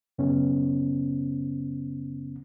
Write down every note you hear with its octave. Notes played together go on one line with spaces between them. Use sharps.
F#2 C#3 B3 C#4